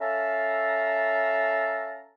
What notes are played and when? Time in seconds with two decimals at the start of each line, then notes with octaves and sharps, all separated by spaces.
0.01 C#4 A4 E5 F5 A5 A#5